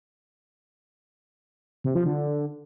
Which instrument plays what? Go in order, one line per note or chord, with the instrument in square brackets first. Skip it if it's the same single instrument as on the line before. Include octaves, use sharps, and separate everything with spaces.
[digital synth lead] C3
F3
D3